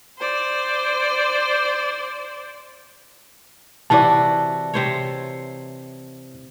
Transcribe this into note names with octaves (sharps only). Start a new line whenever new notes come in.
C5 D5
C3 E3 F#4 D5 A5
C3 C5 C#5